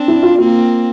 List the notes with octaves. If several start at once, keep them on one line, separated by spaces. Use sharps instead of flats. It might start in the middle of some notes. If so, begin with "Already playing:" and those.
Already playing: C4 D4
E4
F4
A#3 C4 F4